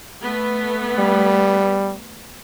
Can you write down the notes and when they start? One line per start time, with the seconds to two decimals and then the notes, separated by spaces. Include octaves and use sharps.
0.19 A3 B3
0.99 G3